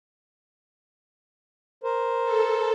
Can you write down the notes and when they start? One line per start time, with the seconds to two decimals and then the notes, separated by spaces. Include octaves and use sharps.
1.84 A#4 C5
2.24 A4